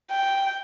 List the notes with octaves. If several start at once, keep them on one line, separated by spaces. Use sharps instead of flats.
G5